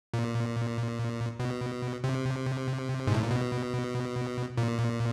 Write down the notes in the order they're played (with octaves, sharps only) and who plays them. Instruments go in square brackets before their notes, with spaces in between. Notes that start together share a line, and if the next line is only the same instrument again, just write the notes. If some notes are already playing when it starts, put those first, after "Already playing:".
[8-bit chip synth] A#2
B2
C3
G#2
A2
A#2
B2
A#2